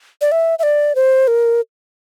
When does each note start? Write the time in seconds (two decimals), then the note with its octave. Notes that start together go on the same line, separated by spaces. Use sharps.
0.21 D5
0.32 E5
0.59 E5
0.63 D5
0.95 C5
1.28 A#4